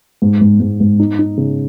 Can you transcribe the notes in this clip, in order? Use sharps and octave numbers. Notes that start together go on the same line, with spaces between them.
G#2
G#2
G#2
G#2
D#4
D#4
C#3